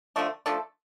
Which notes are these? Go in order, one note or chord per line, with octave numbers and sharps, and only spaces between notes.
D3 F3 A3 D4
F3 A3 D4 A4